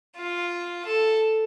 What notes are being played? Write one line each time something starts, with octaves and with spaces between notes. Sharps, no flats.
F4
A4